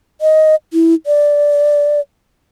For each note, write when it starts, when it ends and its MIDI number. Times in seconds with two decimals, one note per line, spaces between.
0.21 0.55 75
0.73 0.94 64
1.06 2.00 74